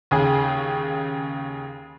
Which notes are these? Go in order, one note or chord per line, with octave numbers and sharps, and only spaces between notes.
D#2 C#3 G#4